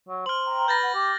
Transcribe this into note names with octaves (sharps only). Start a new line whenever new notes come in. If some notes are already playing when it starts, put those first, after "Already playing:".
F#3
C5 F6 F#7
G5 A#5
B4 G6 A6 A#6
F#5
G4 D6